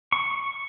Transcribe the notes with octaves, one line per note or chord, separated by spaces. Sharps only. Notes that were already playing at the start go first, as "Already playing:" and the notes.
C#6